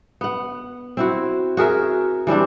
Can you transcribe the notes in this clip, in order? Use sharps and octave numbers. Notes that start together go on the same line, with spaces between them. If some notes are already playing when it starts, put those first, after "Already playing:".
B3 F#5
C4 E4 F#4
F#4 G#4 A#4 E5
E3 G3 C4 D4